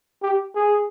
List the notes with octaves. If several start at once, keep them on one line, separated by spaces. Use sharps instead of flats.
G4
G#4